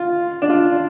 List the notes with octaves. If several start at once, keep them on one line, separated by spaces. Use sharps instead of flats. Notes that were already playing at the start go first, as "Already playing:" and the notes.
Already playing: F4
D4
F4